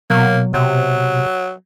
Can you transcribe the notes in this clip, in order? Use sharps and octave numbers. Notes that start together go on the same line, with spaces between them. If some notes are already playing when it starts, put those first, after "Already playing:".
B2 F#3 A#3
C3 F#3